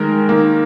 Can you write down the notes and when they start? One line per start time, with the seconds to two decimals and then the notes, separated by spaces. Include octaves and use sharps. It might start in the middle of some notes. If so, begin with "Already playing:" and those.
Already playing: D#3 G#3 A#4
0.29 D#3 A#3